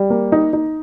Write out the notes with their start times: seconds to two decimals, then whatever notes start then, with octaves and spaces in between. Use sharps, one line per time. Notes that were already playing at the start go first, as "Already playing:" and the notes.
Already playing: G3
0.10 A#3
0.32 D#4
0.53 D#4